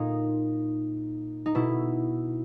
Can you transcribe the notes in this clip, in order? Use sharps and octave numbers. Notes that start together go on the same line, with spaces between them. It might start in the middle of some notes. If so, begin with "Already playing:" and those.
Already playing: A#2 D#4
D#4
B2 E4